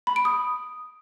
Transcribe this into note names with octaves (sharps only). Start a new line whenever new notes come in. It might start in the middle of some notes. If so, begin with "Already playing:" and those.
B5
D7
D#6